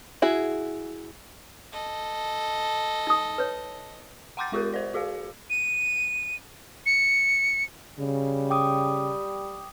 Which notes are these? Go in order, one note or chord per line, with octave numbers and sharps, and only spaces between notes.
E4 F#4 G#4
A4 D#5
D#4 D#6
B4 C#5
F#5 G5 C6 D6 G6 A6
G#3 F4 G4 A#4
C5 D5
F#4 G#4 D5 F5
D#7
C#7
C#3 G3
G5 D6 D#6